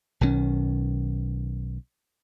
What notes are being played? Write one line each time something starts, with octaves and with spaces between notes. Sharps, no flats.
B1 D#3 G3 C#4